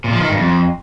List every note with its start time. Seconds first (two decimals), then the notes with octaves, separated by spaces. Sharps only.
0.04 A#2
0.12 F3
0.21 D#3
0.29 G2
0.37 F2